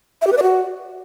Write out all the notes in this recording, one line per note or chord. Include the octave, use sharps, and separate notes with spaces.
E5
G4
B4
D5
F#4